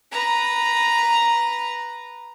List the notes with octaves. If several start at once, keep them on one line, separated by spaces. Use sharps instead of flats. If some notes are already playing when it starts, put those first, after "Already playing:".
B4 A#5